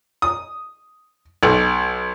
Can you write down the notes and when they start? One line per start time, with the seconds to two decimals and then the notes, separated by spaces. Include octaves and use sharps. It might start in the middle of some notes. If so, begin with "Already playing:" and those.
0.22 D#6
1.43 B1